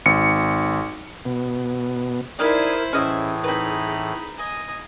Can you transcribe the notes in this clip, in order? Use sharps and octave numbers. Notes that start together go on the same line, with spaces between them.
G#1 C#7
B2
D#3 E4 G#4 A#4 C5 D5 G#5
A2 E3 C#4 G#4 D#5 E5
C4 D#4 B4 B5
D#5 G#5